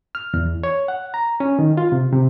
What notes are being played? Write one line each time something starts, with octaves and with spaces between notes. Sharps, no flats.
F6
E2
C#5
F#5
A#5
C#4
D#3
F4
C3
C3